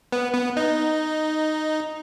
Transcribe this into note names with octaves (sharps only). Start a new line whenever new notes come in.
B3
B3
D#4